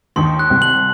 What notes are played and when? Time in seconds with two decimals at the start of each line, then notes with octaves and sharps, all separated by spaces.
0.16 D#2 D#3 C6
0.39 F#6
0.50 C2 C3
0.62 F#7